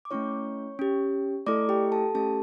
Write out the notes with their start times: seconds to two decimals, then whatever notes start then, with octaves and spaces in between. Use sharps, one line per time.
0.05 D6
0.11 A3 C#4 E4 C#5 C#6
0.79 C#4 G4
1.46 A3 E4 A4 D5 D6
1.69 G4 G5
1.92 A4 A5
2.15 A3 C#4 G4 A4 A5